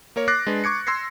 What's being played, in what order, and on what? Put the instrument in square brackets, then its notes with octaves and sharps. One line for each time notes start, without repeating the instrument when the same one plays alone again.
[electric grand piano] A#3 A#4 C#5
D6 F#6 A6 A#6 C7
G#3 D4 B4
C#6 D6 G#6 C#7
C6 E6 G#6 A#6 C7